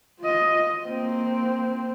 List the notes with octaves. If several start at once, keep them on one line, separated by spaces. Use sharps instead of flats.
F4 D#5
A#3 C4